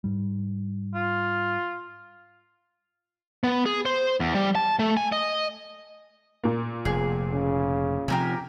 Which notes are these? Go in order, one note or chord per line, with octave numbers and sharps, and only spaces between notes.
G#2 G3
F4
B3
G#4
C5
E2
G3
A5
A3
G#5
D#5
A#2 A#3
F1 G#4
C#3
C3 F3 G4 A#4 G#5